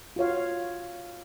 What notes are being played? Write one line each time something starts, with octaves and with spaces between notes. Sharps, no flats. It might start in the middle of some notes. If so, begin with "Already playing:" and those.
F4 F#4 C#5 F5